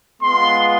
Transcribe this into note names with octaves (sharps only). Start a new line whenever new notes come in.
G#3 B3 F4 C6